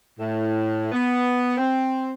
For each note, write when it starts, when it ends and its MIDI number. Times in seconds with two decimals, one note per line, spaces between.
0.19 0.91 45
0.92 1.54 59
1.58 2.11 60